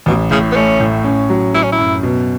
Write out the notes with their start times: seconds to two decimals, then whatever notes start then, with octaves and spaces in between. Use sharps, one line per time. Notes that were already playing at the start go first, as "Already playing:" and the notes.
0.06 A1 B2
0.31 A2 C#3
0.52 B3
0.56 A3 C#4
0.80 A2
1.04 C#4
1.30 F#3
1.54 F#3 E4
1.63 C#4
1.72 E4
1.78 F#2
2.03 B2